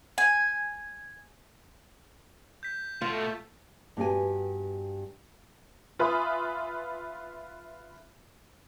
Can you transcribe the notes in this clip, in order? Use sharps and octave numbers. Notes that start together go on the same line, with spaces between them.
G#5
G6 B6
B2 A3 F4
G2 B3 F#4 G4 G#5
F4 B4 E5 G#5 B5 D#6